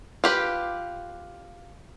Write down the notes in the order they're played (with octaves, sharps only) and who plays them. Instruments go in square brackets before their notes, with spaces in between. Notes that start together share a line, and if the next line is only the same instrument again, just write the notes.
[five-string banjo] F4 G4 B4